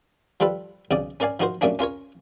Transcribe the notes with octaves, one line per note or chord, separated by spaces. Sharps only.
F3 G3 F4 A4 B4
B1 C#3 D5
C#4 A#4 D5 F5 G#5
F3 D#4 F#4 A#4 C5
F#2 A#2 A3 A#3 C#4 D4
C#4 F4 A#4 C#5